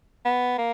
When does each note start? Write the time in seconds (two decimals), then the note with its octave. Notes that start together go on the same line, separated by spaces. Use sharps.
0.25 B3
0.58 A#3